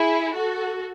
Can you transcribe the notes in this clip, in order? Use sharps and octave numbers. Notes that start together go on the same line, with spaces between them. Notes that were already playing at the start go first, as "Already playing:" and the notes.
Already playing: E4 G#4
F#4 A4